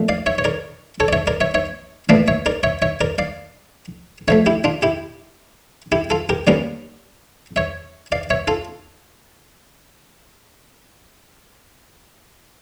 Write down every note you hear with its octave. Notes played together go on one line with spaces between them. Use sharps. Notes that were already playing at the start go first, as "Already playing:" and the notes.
Already playing: A#2 F3 A3
D5 F5
C#5 E5
C#5
A#4 D5
A4 C#5
D5
C#5 E5
A#4 D5
C#5 E5
C#5 E5
A2 E3 A#3 D4 D5 F5
C#5 E5
A#4 D5
C#5 E5
C#5 E5
A#4 D5
D5 F5
D3 F3 A3 C#5 E5
E4 G4
D4 F4
E4 G4
E4 G4
F4 A4
G4 A#4
D3 G3 A#3 C#4 A#4 D5
C#5 E5
D5 F5
C#5 E5
F4 A4